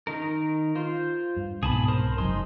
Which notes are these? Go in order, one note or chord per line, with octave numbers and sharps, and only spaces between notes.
D#3 D#4 A#4
F4 C5
G2
C2 G#2 B2 G#4 A5 B5
A#4 C5 A5
F#1 A2 F#3 G#3 D#4 C6